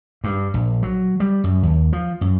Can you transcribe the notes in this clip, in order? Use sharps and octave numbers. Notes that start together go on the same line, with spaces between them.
G2
A#1
F#3
G3
F#2
D#2
F3
F#2